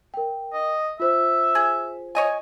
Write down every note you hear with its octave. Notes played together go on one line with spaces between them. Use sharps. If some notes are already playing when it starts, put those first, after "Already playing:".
A#4 G5
D#5
F4 C5 E5
G#4
C#5 D#5 G#5